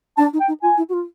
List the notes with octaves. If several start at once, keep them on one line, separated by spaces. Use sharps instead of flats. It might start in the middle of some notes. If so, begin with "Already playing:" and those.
D4 A5
D#4
G5
D#4
F4 G#5
E4
F#4
F4